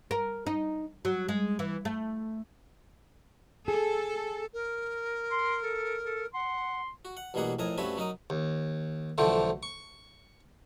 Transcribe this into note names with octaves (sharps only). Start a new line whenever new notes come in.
A#4
D#4
F#3
G#3
E3
A3
G#4 A4
A#4
C6
A4
A4
F#5 C6
F#4
F#5
A1 B2 G3 A#3 G#4 F#5
F2 A2 A#4 G#5 D#6
G2 A3 C4 C#4 F#4 B4
F#3 D#4 A#4 D#6
D#2
B1 D3 E3 F3 A3 C5
C#6